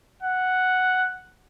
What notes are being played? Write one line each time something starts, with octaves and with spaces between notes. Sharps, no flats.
F#5